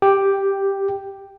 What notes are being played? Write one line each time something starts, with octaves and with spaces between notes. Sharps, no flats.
G4